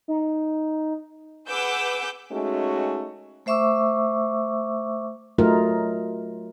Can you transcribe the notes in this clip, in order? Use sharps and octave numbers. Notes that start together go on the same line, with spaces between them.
D#4
G#4 B4 F#5 D6 E6 G6
G#3 A3 C#4 D#4 F#4
A3 C5 E5 C#6 D6 E6
F#3 A3 D#4 F4 A#4